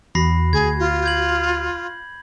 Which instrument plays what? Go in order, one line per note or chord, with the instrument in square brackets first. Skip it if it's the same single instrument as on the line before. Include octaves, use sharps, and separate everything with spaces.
[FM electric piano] E2 [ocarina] F#4 [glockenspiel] B5 A#6 C7
[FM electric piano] D2 [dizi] G#4 [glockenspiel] G#6
[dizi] F4
[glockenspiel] G6 G#6 F#7